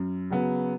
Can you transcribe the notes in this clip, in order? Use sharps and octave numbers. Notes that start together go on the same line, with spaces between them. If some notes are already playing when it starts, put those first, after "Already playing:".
Already playing: F#2
C#3 F#3 B3